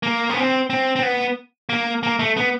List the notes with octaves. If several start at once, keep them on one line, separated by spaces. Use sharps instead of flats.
A#3
B3
C4
C4
C4
B3
A#3
A#3
A3
B3